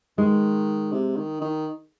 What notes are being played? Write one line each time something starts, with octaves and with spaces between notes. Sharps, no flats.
D#3 G#3
C3
D#3
D#3